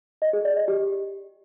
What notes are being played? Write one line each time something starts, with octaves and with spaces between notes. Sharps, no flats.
D#5
G#4
D5
D#5
G4